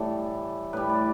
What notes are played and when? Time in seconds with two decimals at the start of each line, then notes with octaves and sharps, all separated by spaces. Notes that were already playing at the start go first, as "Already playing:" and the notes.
Already playing: A2 E3 G3 A4
0.73 A2 G3 B4
0.89 D5